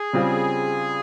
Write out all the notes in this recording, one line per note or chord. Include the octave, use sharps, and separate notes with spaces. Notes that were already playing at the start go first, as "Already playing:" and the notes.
Already playing: G#4
C#3 G3 C4 F4